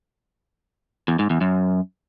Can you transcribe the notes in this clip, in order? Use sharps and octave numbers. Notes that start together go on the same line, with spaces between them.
E2
G#2
E2
F#2